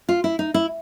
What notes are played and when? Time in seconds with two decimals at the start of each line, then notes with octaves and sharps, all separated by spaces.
0.09 F4
0.24 E4
0.39 D#4
0.54 E4